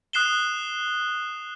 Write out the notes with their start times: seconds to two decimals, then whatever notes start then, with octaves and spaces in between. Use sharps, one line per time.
0.13 D#6 F#6 C7 E7 G7